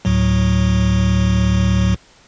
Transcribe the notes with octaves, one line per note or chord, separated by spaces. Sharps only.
D2 A2 F#3